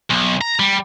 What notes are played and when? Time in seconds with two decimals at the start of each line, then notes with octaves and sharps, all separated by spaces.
0.10 B1
0.41 A#5
0.60 G3